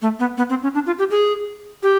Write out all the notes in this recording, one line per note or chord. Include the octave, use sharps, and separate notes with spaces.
A3
B3
B3
C4
C#4
D4
F4
G4
G#4
G4